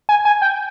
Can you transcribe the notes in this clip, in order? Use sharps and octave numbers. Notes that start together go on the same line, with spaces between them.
G#5
G#5
G5